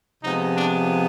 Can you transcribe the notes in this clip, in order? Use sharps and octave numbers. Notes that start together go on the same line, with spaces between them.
C3 F3 G#3 B3 D#4
D4